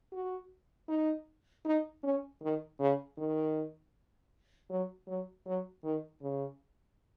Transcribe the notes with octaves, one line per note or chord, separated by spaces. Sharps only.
F#4
D#4
D#4
C#4
D#3
C#3
D#3
F#3
F#3
F#3
D#3
C#3